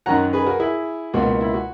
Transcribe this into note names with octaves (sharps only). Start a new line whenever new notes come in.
F#2 D#3 F#3 F#5 A#5
G#4 B4
F#4 A#4
E4 G#4
C#2 B2 A#3 F#4
E4
F#4